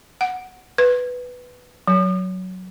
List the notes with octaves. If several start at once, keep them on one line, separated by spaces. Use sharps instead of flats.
F#5
B4
F#3